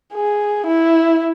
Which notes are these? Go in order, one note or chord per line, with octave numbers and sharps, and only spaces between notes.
G#4
E4